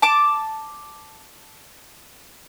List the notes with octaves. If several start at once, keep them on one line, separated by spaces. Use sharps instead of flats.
A5 D6